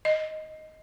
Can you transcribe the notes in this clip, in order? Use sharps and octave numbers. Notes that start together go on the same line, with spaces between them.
D#5